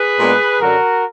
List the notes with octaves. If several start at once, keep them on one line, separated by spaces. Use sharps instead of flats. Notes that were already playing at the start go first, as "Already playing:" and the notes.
Already playing: G#4 B4
A#2 G#3 B3 D4
F#2 D3 F#3 F#4 A#4